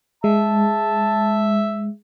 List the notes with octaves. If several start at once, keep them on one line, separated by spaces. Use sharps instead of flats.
G#3 E5 A5